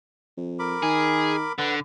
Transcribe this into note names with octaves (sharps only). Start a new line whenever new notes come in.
F2
A#4 B5 D6
D#3 G#4
D3 B4 F#5